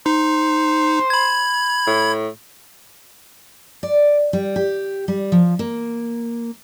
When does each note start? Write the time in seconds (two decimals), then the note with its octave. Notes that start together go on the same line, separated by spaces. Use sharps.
0.06 D#4 C5
1.10 B5 G#6
1.87 A2
3.83 D5
4.33 G3
4.56 G4
5.08 G3
5.32 F3
5.59 A#3